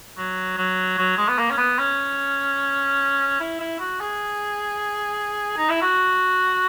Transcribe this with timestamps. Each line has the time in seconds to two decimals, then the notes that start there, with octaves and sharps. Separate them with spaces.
0.17 F#3
0.57 F#3
0.98 F#3
1.17 G#3
1.28 B3
1.38 A#3
1.51 C#4
1.58 B3
1.79 C#4
3.40 E4
3.60 E4
3.79 F#4
4.00 G#4
5.57 D#4
5.70 E4
5.82 F#4